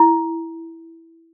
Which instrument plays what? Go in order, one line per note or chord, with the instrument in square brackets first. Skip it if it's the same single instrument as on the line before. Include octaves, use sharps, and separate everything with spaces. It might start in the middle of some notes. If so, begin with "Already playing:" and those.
Already playing: [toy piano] E4